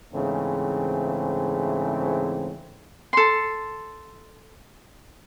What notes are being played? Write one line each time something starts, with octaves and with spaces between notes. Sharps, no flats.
G#2 C#3 E3 A3 C4
A4 C6